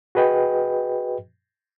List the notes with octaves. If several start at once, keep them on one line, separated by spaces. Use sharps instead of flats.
F#4 G#4 B4 D#5 G5